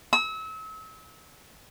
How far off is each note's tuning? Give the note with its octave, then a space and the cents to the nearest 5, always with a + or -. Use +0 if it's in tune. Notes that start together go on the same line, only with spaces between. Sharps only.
E6 -35